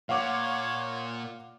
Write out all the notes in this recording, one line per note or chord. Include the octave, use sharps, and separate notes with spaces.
A#2 C#5 F5 F#5 D6